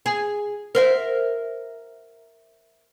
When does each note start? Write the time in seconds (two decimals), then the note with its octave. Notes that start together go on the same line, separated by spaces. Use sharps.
0.06 G#4
0.75 A#4 C5 E5